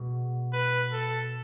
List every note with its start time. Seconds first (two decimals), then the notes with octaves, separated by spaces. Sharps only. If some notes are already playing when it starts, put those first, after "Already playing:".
Already playing: B2 G#3
0.53 B4
0.92 A4